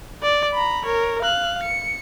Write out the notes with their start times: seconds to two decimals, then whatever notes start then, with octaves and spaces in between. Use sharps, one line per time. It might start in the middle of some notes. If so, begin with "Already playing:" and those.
0.23 D5
0.54 A#5 B5
0.85 A#4 C#5
1.22 F5 F#6
1.63 C#7